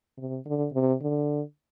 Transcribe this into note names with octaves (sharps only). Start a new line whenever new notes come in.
C3
D3
C3
D3